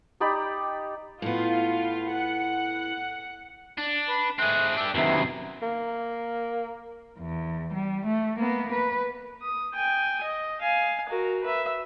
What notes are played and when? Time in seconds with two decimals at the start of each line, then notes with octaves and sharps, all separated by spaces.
0.20 D#4 G4 D5 B5
1.22 A2 B3 F4
2.13 F#5
3.78 D4
4.08 B4
4.39 A3 C4 G#4 F#6
4.77 D4 G4 E6
4.95 F#2 C3 D#3 B3 E4 C7
5.62 A#3
7.19 E2
7.73 G3
8.06 A3
8.39 A#3 B3
8.72 B4
9.42 D#6
9.75 G5 G#5
10.23 D#5
10.62 F5 G#5
11.08 F#4 A#4
11.43 B4 E5